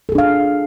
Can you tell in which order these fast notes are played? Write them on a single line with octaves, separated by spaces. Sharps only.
A4 G#4 D4 F5